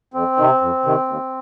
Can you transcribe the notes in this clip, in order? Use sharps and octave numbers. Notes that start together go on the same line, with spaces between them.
F2 C4
C3 D#3
F2
C3 D#3
D#2